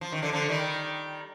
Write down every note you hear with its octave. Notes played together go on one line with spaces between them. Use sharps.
F3
D#3
D3 F3
D3 F3
D#3 G3